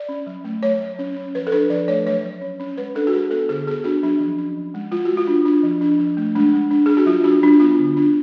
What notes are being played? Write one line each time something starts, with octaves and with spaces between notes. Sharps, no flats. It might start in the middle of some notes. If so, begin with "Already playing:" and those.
Already playing: D5
C#4
F#3
A3
F#3 C#5
F#3
C#4
C#4
F3 B4
A4
D4 B4
F3 D5
A3 C#5
F#3 C#5
F#3
C#4
C#4
G#3 B4
D4 A4
F#4
G#3 G#4
B3 A4
D3 G#4
B3 G#4
D4 F#4
F#3 D4
F3
C#4
F3
G#3
G#3 F4
F#4
G#3
F4
D4
D4
F3
D4
F3
A3
G#3 D4
G#3
D4
D4 G#4
F#4
F#3 F4
D4 F#4
F#3 D4
B3 F4
D3
D4